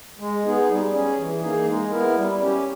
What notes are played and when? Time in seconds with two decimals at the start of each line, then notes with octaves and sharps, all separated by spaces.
0.19 G#3
0.44 B3 D#4 G#4
0.69 G3
0.93 C#4 G#4
1.17 E3
1.42 A#3 D#4 G#4
1.67 G#3
1.91 B3 E4 A#4
2.16 G3
2.40 C#4 G4